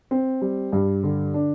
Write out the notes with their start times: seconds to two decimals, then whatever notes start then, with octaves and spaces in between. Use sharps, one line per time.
0.11 C4
0.42 G3
0.72 G2
1.03 D3
1.34 D4